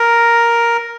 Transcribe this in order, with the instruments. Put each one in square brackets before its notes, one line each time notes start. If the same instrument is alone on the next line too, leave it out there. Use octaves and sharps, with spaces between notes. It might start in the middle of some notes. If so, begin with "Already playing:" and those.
Already playing: [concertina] A#4